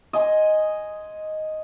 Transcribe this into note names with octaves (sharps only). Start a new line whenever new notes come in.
D#5 G#5 C6